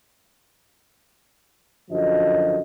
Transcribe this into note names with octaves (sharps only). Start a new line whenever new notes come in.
F#2 D3 F3 F#4 D#5